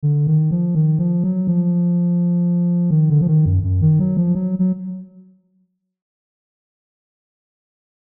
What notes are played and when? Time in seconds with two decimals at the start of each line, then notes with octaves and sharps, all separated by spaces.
0.03 D3
0.27 D#3
0.51 F3
0.75 D#3
0.99 F3
1.24 F#3
1.47 F3
2.91 D#3
3.10 D3
3.21 F3
3.27 D#3
3.46 F#2
3.63 F#2
3.82 D#3
3.99 F#3
4.17 F3
4.35 F#3
4.59 F#3